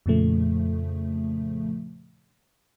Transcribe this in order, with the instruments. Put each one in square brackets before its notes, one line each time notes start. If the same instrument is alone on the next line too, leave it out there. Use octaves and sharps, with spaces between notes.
[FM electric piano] F2 A#2 C#3 F3 A3